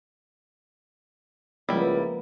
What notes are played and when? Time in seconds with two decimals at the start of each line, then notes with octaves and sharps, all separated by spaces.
1.69 C#2 F3 G3 A#3 B3 E4 A#4